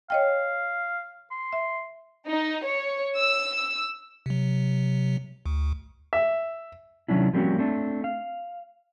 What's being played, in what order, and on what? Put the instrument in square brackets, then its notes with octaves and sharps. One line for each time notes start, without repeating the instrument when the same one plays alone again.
[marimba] C#5 D#5 G5 [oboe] F5
[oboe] C6
[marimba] E5
[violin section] D#4
C#5
E6
[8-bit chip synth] C3 F#3
D2
[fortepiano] E5
[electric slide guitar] C3 D#3 F#3 C#4 D4 E4
F3 G3 A#3 C4 C#4 F#4
A3 C4 D4
F5